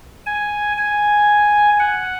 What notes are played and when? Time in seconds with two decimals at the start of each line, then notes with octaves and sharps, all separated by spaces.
0.26 G#5
0.78 G#5
1.79 F#5